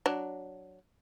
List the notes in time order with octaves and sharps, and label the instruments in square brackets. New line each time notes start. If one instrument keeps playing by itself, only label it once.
[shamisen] F#3 D4